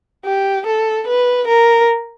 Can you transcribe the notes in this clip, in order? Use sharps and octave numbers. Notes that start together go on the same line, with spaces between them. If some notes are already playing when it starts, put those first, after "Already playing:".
G4
A4
B4
A#4